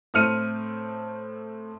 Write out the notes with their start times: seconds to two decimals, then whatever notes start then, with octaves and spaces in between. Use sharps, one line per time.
0.14 A2 A3 C4 F6 C#7 D#7